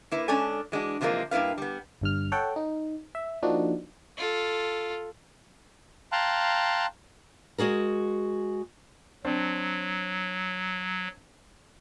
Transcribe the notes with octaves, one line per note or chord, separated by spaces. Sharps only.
A#3 E4 B4
G#3 C#4 D4 A4 G#5
E3 G#3 D4 F#4
C3 E3 F3 G#3 A#3
G2 A#3 E4 B4 F5
G3 B3
G1 G2 F6
A4 C#5 F#5 G5
D#4
E5
F3 A#3 D4 D#4 F#4
F4 A4
F5 G5 A5 A#5 C6 F#6
G#3 F#4 G#4 A#4
F#3 C4 D4